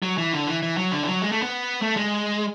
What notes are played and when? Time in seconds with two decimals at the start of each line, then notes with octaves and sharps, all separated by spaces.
0.02 F#3
0.18 E3
0.33 D3
0.47 E3
0.62 E3
0.77 F#3
0.92 D3
1.03 E3
1.08 F#3
1.22 G#3
1.32 A3
1.42 B3
1.82 A3
1.97 G#3